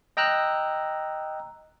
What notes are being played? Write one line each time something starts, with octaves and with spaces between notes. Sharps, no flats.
D#5 G5 A#5 E6 F#6